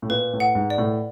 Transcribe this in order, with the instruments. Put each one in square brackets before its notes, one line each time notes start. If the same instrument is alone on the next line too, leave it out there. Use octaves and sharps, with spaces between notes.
[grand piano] A2
[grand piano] A#2 [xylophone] B4
[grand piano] A2
[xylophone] F#5
[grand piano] G#2
[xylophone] D5
[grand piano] A2